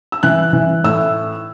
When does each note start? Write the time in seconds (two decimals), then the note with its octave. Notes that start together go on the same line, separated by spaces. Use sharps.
0.12 E6
0.23 E3 F#6
0.53 E3
0.84 A2 E6